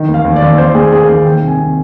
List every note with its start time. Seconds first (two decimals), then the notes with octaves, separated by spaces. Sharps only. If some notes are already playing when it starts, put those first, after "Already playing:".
Already playing: D#3
0.08 D#2
0.14 F5
0.25 D#2
0.36 D5
0.42 D#2
0.58 D#2 C5
0.75 D#2 G#4
0.92 D#2 G#4
1.02 A#4
1.09 D#2 G#4
1.25 D#3 G5
1.42 C2
1.47 G#5
1.58 C2